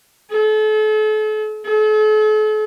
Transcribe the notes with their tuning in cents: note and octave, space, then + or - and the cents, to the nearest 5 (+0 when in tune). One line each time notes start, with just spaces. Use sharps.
A4 -40
A4 -45